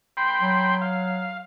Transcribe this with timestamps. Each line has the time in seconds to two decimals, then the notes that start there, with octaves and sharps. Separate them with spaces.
0.17 G5 B5 C6
0.41 F#3
0.81 F5